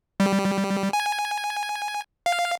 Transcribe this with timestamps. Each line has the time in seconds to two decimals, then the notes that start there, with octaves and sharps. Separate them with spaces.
0.20 G3
0.93 G#5
2.26 F5